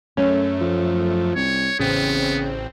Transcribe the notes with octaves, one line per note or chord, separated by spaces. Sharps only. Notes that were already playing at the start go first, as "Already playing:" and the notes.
F#2 A3 C#4
F3
C2 C#5
A1 C#3 B3 C4